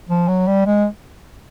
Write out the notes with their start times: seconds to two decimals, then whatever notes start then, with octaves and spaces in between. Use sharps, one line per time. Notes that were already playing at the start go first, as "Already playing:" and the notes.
0.09 F3
0.28 F#3
0.47 G3
0.66 G#3